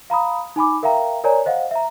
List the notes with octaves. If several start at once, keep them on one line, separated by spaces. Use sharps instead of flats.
F5 A#5 B5 D#6
D#4 G#5 B5 D6
A#4 E5 F5 G5 A#5
A#4 C#5 D5 G#5 A#5
C5 D#5 F5 F#5
E5 A#5